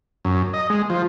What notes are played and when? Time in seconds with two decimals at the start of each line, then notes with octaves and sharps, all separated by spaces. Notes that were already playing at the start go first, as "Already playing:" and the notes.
0.25 F#2
0.53 D#5
0.70 G#3
0.90 F3